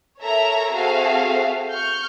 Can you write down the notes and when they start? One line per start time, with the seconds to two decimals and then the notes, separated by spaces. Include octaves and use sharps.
0.21 A4 A#4 C#5 E5 A#5
0.73 C4 F#4 G#4 A4 E5 F5
1.72 C#6 F6 G6